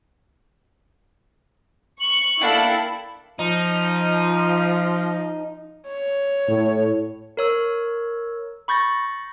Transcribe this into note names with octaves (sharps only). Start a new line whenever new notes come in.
C#6 F#7
A#3 D4 E4 A4 G5
F3 D#4
C#5
A2
A#4 C#5 E6
B5 C#6 G6 A6 A#6